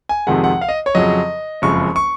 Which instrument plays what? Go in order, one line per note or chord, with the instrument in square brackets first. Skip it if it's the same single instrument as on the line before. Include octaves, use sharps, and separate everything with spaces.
[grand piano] G#5
F2 C3 D#3 G#3 F#5
F#5
F5
D#5
C#5
F2 C#3 F#3 D#5
F#1 F2 C#3 G#3 C#6
C#6